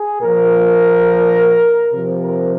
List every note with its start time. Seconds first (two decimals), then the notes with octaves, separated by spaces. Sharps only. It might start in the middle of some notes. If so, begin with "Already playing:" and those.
Already playing: G#4
0.21 A#2 F3 A#4
1.92 C3 F3
2.21 A#4